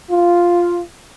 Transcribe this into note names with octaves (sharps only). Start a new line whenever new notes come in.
F4